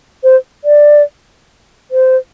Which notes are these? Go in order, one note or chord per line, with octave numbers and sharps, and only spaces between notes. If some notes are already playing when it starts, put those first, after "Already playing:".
C5
D5
C5